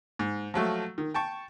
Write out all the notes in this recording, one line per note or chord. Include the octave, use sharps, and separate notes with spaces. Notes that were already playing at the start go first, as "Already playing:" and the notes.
G#2
F3 F#3 A3
D#3
G5 A5 C#6